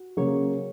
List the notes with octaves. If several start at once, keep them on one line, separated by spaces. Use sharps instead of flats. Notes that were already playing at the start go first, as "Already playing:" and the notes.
Already playing: F#4
C#3 F#3 A#3 C#4 G#4 C#5